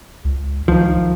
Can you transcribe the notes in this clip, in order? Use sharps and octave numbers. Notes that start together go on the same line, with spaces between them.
C#2
C#2 D#3 F3